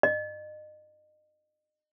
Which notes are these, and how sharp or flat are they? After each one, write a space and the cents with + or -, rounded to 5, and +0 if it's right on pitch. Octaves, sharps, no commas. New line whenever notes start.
D#5 -35